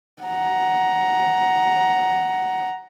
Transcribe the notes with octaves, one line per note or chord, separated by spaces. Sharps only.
F#5 A#5